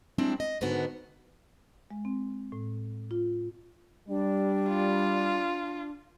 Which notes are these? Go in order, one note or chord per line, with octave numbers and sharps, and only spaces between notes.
G3 G#3 C4 D4 E4
D#5
G#2 D3 D#3 G#3 B3 F#4
G#3
C4
A2
F4
G3 D4
F4